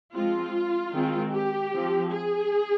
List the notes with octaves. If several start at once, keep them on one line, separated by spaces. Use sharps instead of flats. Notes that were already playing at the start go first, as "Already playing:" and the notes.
F3 G#3 C4 F4
D#3 G#3 C4
G4
F3 C4
G#4